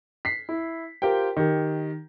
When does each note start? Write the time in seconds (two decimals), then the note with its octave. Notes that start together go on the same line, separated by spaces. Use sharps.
0.25 B6 C7
0.49 E4
1.02 F4 G4 A#4 C5 G5
1.37 D#3 G4